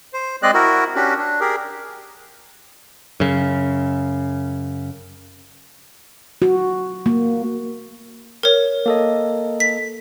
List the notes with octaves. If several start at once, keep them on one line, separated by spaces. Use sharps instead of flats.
C5
G#3 C4 G#4 D5 D#5 F#6
E4 F#4 A#4
C#4 D4 F#4 G4
D4
G4 G#4 A#4
F#2 C#3
F#4
A#3
A#4 C#5
A#3 A4 D#5
B6